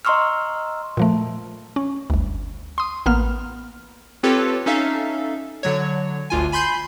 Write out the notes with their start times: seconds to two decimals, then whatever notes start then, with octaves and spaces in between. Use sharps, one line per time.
0.05 D#5 A#5 C6 C#6 E6 F6
0.97 A#2 F3 A3
1.76 C#4
2.10 G1 D2
2.78 C6 D#6
3.06 A1 A#3 B3 F6
4.23 C4 F4 G4 A4 B4 C#5
4.66 C#4 D#4 A4 E5 F5
5.63 D3 F#3 C#5
6.30 G1 D2 F4 G#5
6.52 G#5 B5 C6 G6 C7